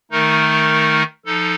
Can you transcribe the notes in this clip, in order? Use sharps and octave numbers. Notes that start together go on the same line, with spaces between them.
D#3 A3 D#4 A#4
F3 D#4 A4